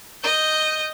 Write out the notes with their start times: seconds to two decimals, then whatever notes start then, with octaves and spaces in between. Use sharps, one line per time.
0.23 D#5 G6